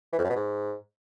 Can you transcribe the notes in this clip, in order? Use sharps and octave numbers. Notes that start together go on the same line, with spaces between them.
E3
F2
F#2
B2
G#2